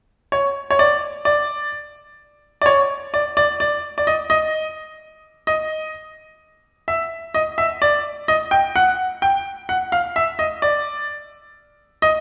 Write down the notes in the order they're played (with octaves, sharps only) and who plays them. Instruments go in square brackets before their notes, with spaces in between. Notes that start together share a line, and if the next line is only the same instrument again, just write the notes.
[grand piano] C#5
C#5
D5
D5
D5
C#5
D5
D5
D5
D5
D#5
D#5
D#5
E5
D#5
E5
D5
D#5
G5
F#5
G5
F#5
F5
E5
D#5
D5
D#5